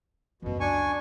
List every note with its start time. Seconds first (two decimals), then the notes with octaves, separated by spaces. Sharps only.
0.42 C#2 F#2 B2
0.60 D4 G#5 C#6